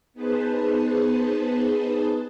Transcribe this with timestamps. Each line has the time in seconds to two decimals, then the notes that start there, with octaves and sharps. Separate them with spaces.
0.14 B3 D#4 G#4 B4 C5 A5